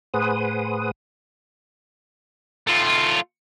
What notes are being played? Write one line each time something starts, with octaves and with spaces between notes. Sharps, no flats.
A2 G#4 B4 C5 F#5 D#6
A3 F4